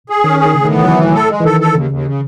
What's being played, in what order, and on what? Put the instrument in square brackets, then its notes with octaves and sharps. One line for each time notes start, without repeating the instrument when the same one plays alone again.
[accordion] G#4
[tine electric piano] D#3 [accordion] C#4
[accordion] G#4
[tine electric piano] D#3
[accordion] A2 [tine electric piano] C#3
[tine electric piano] D#3
[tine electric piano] E3 [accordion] B3
[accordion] E3 [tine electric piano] F#3
[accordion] A2
A4
G#3
[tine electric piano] E3
[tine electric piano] D#3 [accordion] A4
[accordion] A4
[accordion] D#2 [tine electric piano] C#3
[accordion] D#2
C#3